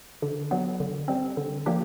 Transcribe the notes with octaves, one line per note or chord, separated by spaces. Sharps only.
D3
F#3 B3
D3
G3 C4
D3
F3 A#3 D4 G4